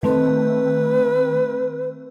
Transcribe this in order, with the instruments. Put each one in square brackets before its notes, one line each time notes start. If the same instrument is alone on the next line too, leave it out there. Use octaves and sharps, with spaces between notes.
[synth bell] D#3 A3 C4 [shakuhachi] B4